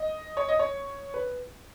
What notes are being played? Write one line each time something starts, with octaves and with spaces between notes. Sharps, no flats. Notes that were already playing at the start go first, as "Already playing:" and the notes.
Already playing: D#5
C#5
D#5
C#5
B4